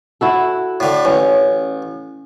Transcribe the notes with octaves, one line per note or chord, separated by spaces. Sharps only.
E4 F#4 A4
A2 D3
A1 C#4